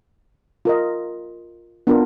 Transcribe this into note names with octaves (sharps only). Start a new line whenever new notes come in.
F4 A#4 D#5
B3 D4 F4 A#4